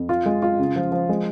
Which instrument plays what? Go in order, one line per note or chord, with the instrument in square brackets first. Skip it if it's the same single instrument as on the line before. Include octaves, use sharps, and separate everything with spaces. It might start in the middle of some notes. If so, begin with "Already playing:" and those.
Already playing: [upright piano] F2
F4
G#3
F4
C#3
F3
F3
G#3